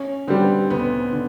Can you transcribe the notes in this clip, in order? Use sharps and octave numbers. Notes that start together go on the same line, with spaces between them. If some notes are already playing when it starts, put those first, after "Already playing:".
Already playing: C#4
D3 G3 B3 C4
D2 B3
D3